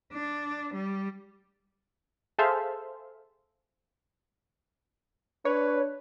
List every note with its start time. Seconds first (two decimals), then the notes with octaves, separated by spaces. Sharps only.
0.13 D4
0.74 G3
2.39 G#4 A4 C5 E5 F5
5.45 D4 B4 C#5